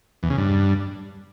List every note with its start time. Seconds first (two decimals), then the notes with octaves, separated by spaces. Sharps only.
0.23 E2
0.30 C#3
0.38 G2